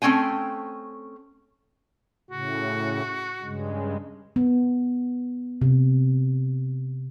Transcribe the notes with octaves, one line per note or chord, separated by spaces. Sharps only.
A3 C4 C#4 G5 G#5
A2 C#3 F#4
G2 C#3 G#3
B3
C3